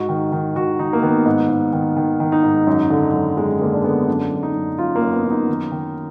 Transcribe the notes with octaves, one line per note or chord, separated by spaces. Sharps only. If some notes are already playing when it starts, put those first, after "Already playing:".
Already playing: G#2 F#4
D#3
D#3
D#3 F#4
D#3 D#4
A#3
D#3 B3
G#2
G#2
D#3
D#3
D#3
D#4
G#2
F#2
D3
F#2
F#2 G#3
D3 A#3
D4
D3 B3
F#2 D4
F#2
D#4
F#2
F#2 F4
A#3
F#2
B3
F#2 F4
D#4
D#3
D#3